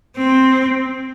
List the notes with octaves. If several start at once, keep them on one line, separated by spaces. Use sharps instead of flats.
C4